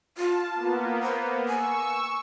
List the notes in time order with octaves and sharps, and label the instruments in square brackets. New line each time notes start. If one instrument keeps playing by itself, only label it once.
[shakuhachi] F4 [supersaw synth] A5
[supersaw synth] A#3 B3
[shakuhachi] C5
[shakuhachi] G#5 [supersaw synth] C#6 E6